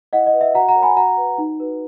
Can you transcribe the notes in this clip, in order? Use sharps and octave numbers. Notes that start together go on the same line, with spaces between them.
E4 D#5 F#5
D#5
B4
E5
F#4 F#5 A#5
F#5 A#5
A#4 C#5
G#5 B5
F#4 F#5 A#5
B4
D#4
F#4 B4